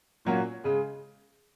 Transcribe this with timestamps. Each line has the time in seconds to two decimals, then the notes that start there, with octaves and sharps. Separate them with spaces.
0.25 A#2 F#3 A#3 C#4 F#4
0.64 C#3 G#3